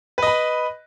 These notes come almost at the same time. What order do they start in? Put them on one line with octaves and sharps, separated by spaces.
B4 D#5 B5